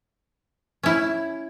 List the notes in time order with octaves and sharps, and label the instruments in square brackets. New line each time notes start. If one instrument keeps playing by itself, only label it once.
[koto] C#4 E4